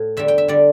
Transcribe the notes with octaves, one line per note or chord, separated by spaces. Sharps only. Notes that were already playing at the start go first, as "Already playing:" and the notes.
Already playing: A2
E2 D3 G3 E5
G5
E5
D3 G3 D5